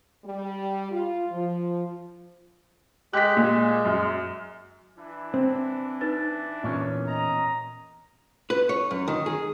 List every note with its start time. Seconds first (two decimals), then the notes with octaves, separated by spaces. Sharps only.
0.24 G3
0.91 F4
1.31 F3
3.13 G#3 G4 F#6 B6
3.37 A#2 G#3
3.85 F#2
4.98 E3 D4 E4
5.34 C4
6.01 D#4 B4 A6
6.64 E2 A#2 C#4
7.07 D#5 A#5
8.50 B4
8.69 C#5
8.91 F#2
9.08 D#3
9.26 G#4